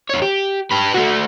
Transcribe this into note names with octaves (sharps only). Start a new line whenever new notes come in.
E2 C#5
G4
G4 B4
A3 F#4